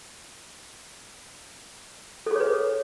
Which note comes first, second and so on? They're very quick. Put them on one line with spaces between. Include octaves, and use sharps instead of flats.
A4 G#4 C#5 B4